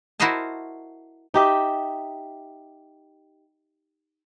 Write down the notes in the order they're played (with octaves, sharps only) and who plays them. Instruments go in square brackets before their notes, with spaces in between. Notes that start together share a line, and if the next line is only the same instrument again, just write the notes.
[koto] E4 F#4 A#4 C5 D#5 A5
[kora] D#4 G4 E5